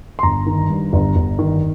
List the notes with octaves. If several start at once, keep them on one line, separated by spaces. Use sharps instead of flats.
C6
G1 A#5
D#3
G2
G1
G1
D#3